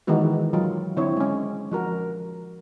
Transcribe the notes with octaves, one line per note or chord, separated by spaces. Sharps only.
D#3 E3 G#3 B3 F#4
F#3 F4
D3 C4 E4 C#5
G#3 C#4
F3 F#4 A#4